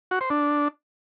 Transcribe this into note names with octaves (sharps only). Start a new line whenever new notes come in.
F#4
C5
D4